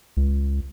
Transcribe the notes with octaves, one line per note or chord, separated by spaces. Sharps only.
C#2